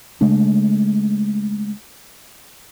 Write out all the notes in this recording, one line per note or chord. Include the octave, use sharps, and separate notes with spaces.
C#3 G#3 A3 D4